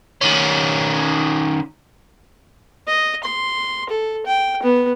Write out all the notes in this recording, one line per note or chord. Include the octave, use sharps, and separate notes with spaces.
D#3 C#4
D#5
C6
A4
G5
B3